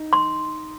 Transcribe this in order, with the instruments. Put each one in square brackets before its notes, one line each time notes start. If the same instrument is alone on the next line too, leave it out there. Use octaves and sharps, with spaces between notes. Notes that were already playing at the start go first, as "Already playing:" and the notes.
Already playing: [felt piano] D#4
[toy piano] C6